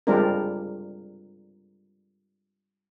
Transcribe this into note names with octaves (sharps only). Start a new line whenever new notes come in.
G3 G#3 C4 D4 F4 A#4